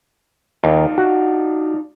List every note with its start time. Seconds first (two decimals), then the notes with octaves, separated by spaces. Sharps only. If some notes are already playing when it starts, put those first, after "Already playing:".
0.64 D#2 D4 D#4 F4
0.98 F#4